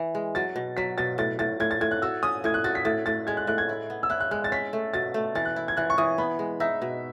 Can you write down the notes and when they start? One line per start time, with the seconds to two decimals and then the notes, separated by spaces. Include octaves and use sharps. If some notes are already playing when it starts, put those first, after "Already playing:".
Already playing: E3
0.15 G#3
0.35 F#3 A6
0.56 B2
0.77 F#3 B6
0.98 B2 A6
1.18 A2 A6
1.39 A2 A6
1.60 A2 G#6
1.71 A6
1.81 A2 G#6
1.91 F#6
2.02 F#4 E6
2.23 C#4 D#6
2.44 A2 G#6
2.54 F#6
2.64 F#4 A6
2.75 B6
2.85 A2 A6
3.06 A2 A6
3.27 G#3 G#6
3.37 F#6
3.47 A2 F#6
3.58 G#6
3.69 E4
3.90 B3
4.03 E6
4.10 E4 F#6
4.20 F#6
4.31 G#3 F#6
4.44 A6
4.52 C#4 B6
4.73 A3
4.94 B2 A6
5.14 A3
5.35 E3 A6
5.45 F#6
5.56 E4
5.68 G#6
5.77 E3 F#6
5.90 C#6
5.98 E3 D#6
6.18 B3 B5
6.39 G#3
6.60 D#4 E5
6.82 B2